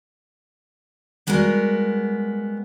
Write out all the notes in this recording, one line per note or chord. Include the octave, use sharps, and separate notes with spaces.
G3 G#3 B3 F#4 A#4